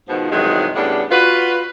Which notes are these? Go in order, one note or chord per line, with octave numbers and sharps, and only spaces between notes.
G#2 B2 D#3 F3
G2 C3 D#3 E3 F#3 G#3
A2 C#3 G3 B3 D4
F4 F#4 B4